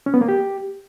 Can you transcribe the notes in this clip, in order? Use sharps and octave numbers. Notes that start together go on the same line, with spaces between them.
C#4
B3
A#3
G4